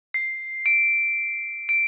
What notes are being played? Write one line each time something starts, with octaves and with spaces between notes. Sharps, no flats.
C7
D7
D7